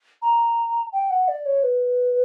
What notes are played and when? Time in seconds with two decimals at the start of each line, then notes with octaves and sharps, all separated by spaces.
0.22 A#5
0.92 G5
1.10 F#5
1.28 D5
1.46 C#5
1.63 B4